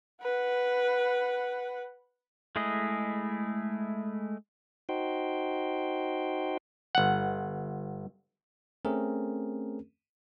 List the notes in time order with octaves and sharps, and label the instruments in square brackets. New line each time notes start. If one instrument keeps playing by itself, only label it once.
[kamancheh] B4 F#5
[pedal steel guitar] G#3 A3 E4 G#4 D#5
[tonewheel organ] D#4 F#4 C5 G5
[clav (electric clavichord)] G1 F#5
[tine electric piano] A3 C4 C#4 G#4 A#4